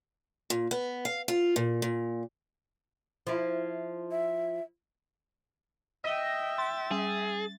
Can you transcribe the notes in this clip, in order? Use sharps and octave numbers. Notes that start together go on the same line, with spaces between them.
A#2
B3
F5
F4
A#2
A#2
F3 E4
E5
D#5 E5 G5
C6 A6
G3 G#4